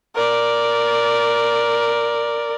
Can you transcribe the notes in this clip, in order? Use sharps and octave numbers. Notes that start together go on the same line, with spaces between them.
A#4 D5